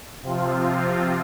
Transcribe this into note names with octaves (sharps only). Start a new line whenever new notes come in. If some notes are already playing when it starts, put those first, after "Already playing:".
C3 F3 C4 F4